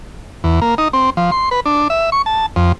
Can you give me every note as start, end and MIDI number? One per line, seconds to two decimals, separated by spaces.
0.44 0.60 40
0.62 0.75 58
0.78 0.88 63
0.93 1.10 60
1.17 1.31 53
1.31 1.49 84
1.51 1.60 71
1.66 1.88 62
1.90 2.10 76
2.12 2.22 85
2.26 2.46 81
2.56 2.72 41